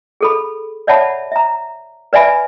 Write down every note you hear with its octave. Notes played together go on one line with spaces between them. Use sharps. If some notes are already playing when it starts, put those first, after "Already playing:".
G#4 A4 B5
C#5 D5 E5 F#5 A5 B5
E5 A#5
B4 D5 E5 G#5 B5